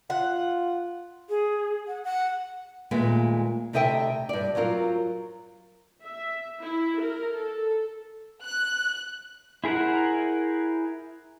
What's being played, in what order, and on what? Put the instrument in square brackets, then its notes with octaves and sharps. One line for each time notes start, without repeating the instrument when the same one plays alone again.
[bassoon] F4 [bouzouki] F#5
[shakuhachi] G#4
F#5
F#5
[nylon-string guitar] D#2 A#2 G#3 A3 B3
D2 C3 A4 D#5 E5 G5
G2 D5
F#3 C4 F4 A#4
[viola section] E5
E4
A#4
A4
[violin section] F#6
[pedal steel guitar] E4 G#4 A#4 C5 F#5